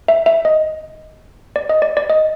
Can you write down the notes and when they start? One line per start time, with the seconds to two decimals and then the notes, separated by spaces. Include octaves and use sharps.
0.08 E5
0.26 E5
0.45 D#5
1.56 D5
1.69 D#5
1.82 D5
1.97 D5
2.10 D#5